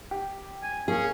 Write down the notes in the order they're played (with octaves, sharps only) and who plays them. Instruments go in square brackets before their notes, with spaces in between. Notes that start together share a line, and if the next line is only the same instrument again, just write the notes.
[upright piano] G4
[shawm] G#5
[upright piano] A#3 [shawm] C#4 [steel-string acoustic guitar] G#4